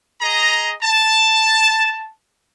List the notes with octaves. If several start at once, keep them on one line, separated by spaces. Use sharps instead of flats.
G#4 D#5 A#5
A5